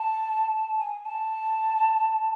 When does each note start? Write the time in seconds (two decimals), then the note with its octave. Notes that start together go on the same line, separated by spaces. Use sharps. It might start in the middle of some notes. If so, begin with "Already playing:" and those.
Already playing: A5
0.79 G#5
1.05 A5